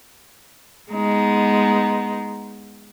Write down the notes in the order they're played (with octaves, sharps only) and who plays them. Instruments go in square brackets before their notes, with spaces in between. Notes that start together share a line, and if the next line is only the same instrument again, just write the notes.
[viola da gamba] G#3 B3 D#4